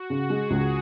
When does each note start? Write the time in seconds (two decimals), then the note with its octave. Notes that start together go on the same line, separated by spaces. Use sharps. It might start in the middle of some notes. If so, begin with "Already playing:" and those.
Already playing: F#4
0.10 C#3
0.30 G#3 G#4
0.50 C#2